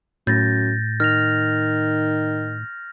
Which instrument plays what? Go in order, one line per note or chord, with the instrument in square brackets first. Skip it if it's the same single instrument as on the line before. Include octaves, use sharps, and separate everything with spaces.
[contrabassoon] F#2 [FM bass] A2 [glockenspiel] G6 A6 A#6
[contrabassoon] D#3 [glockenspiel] F6 A#6 F7